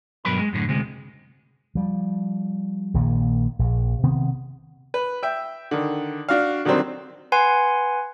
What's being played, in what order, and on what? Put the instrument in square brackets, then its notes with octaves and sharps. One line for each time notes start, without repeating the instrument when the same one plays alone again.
[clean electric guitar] G2 B2 F#3 A#4 B4 B5
G#3
F#2 A2 D3
D2 C3 G#3
[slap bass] F3 G3
A#1 A#2 D#3 A#3
A#1
C3 D#3 B3 C4
[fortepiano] B4
E5 G5
D3 D#3
D4 F#4 F5
D3 D#3 F#3 G3 C4
[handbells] B4 F#5 G#5 C6